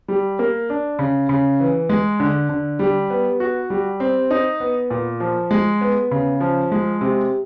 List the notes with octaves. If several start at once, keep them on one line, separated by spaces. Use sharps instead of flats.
G3
A#3
D4
C#3
C#3
E3
G#3
D3
D3
G3
B3
F#4
G3
C4
D#4
B3
A#2
F3
G#3
B3
C#3
F3
G#3
C3